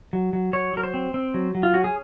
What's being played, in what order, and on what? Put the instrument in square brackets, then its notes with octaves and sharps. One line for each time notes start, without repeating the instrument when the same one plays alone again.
[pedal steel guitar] F#3
F#3
F#3 C#5
F#3 A#4
C5
C4
C4
F#3
F#3
F4
C#4 F#4
G#4